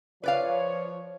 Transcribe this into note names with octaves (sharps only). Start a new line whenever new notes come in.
F3 B4 C#5 D5 F5